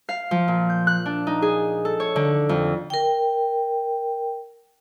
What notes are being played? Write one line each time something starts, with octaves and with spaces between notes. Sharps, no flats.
F5
F3
A#2
G6
F#6
D4
D#4
G#4
A4
C#5
D3
F2
A#4 G5